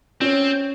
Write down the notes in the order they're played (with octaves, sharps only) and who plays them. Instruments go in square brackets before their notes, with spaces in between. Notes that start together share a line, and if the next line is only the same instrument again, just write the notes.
[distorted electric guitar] C4 [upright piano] C#4